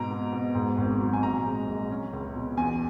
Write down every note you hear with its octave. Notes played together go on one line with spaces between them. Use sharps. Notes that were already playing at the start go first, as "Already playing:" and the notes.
Already playing: G#2 B2 A#5
B2
B2
G#2
G#1
F#3
G#5
A#1 A#5
G#3
A#1
C#4
C#2
B2
E2 G#5